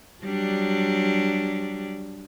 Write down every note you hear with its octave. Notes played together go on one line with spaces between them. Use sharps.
F#3 G3 D4